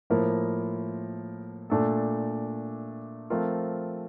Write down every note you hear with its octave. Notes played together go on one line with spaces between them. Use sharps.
A2 F3 A#3 E4 A#4
A#2 A3 D4 A4
F3 A3 C4 F4 A#4